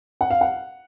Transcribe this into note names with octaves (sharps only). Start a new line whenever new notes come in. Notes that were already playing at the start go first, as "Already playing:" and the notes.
F#5
F5
F#5